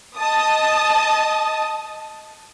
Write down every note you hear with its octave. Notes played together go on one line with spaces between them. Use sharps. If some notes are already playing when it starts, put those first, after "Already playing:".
D#5 A5 D#6